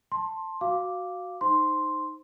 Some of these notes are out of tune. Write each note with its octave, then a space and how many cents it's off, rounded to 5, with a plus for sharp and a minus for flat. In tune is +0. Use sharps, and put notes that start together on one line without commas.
A5 +5 C6 +15
F#4 +0 F5 +0 D6 +0
D#4 -5 C5 +0 C6 +0